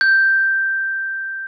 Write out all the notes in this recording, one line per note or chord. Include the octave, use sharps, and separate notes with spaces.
G6